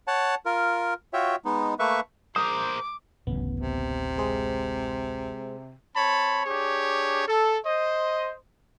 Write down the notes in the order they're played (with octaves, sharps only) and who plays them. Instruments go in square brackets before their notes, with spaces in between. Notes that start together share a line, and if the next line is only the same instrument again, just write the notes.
[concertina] C#5 F#5 A5
F4 A#4
F4 F#4 C#5 E5 G5
G#3 B3 D#4
A3 A#3 B4 E5 C#6
[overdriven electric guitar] A#4 C5 [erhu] D6 [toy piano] D#6
[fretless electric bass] D1 A1 C#3 [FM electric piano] B3
[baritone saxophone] C3
[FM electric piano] G#3 G#4 C5
[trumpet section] C4 C#5 A5 B5
D4 G4 G#4 C#5
A4
C5 D#5